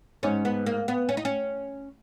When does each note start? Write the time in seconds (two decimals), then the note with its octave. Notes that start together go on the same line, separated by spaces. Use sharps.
0.23 G#2 C#4
0.45 B3
0.66 A#3
0.88 B3
1.09 C#4
1.17 D#4
1.25 C#4